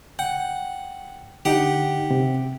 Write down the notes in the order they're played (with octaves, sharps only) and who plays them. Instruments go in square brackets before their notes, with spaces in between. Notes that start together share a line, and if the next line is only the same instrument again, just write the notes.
[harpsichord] F#5 [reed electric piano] G5
[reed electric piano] D3 D#4 [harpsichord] G4 F#5
[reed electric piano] C3